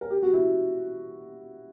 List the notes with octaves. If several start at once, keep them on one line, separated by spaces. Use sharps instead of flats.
A#4
G4
F#4
E4